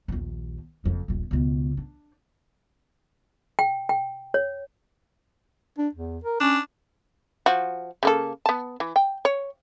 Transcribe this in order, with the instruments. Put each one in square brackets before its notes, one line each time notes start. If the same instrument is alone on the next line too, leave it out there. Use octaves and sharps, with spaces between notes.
[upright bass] A#1 D#2
F#1 F2
D#1 A#1
C#2 B2
D4
[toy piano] G5
G5
C#5
[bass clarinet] D4
E2
A#4
[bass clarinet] C#4 [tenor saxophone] D4
[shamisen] F3 F#4
C#3 A#3 A4
B3 A5
E3
G5
C#5